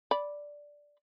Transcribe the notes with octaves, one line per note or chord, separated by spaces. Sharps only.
D5 B5